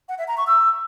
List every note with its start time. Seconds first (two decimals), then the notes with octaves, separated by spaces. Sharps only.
0.09 F#5
0.18 E5
0.28 A#5
0.37 C#6
0.47 E6